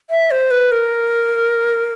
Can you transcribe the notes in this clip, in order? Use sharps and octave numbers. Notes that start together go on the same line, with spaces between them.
E5
C5
B4
A#4